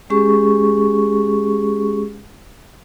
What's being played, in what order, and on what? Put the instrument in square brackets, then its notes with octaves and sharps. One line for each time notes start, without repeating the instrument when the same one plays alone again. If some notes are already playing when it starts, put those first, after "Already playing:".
[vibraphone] G#3 C#4 G4 G#4 C#6